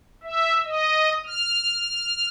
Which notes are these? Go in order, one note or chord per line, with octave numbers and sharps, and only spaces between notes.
E5
D#5
F6